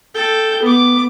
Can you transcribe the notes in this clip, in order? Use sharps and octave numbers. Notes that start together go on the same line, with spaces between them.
A4 G5
B3 D6